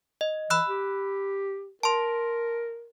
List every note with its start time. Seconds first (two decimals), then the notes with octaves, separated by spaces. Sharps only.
0.21 D#5
0.50 E3 B5 E6 F#6
0.67 G4
1.83 A#4 A5 C6